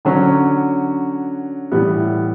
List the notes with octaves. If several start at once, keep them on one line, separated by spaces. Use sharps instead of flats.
D3 F#3 C#4
A2 E3 G3 B3